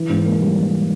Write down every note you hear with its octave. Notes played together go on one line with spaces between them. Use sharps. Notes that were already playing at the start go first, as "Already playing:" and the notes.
Already playing: E3
G#2
A#3
G3
E3